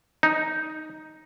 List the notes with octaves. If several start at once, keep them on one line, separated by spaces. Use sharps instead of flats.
D#4